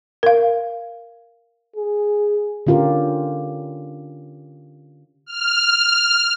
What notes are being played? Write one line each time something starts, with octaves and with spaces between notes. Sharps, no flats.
A#4 F5
G#4
D3 C#4 F4 G4 A#4
F6